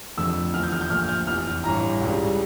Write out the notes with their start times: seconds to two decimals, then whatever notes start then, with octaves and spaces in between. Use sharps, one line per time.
0.17 F1 F2 D3 A3 E6
0.54 E2 D3 F3 F6
0.63 G6
0.72 F6
0.81 G6
0.90 A#1 A#2 A3 F6
1.09 G6
1.27 F1 E2 E3 F6
1.64 A1 G2 E3 A#5
2.01 C#2 C#3 G3